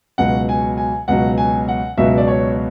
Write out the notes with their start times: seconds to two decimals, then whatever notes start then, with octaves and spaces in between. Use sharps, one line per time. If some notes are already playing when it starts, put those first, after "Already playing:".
0.18 C#2 B2 F#3 F#5
0.49 G#5
0.78 G#5
1.08 C#2 B2 F#3 F#5
1.38 G#5
1.68 F#5
1.98 C#2 B2 F#3 E5
2.18 D5
2.28 C#5